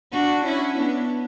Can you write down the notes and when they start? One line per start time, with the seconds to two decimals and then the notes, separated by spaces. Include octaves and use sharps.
0.12 D4 F#4
0.45 C#4 E4
0.77 B3 D4